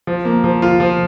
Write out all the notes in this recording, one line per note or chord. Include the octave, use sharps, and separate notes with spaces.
F3
A#3
F3
F4
F3